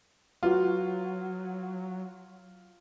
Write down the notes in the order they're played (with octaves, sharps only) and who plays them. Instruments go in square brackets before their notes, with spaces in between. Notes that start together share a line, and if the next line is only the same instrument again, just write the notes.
[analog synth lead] F#3 [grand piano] F4 [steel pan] F#4 B4 F5